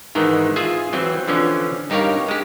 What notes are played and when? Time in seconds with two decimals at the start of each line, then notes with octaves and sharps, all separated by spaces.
0.15 G#2 D#3 E3
0.56 F4 G#4 E5 G#5
0.93 E3 F#3 C4
1.28 D3 E3 F3 C#4
1.90 G2 D#4 G4 A#4 C#5 F5
2.28 G#3 G4